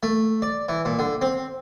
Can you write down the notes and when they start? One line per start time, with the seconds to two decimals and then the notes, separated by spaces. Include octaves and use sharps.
0.03 A3
0.42 D5
0.69 E3
0.85 A#2
0.99 D3
1.21 C4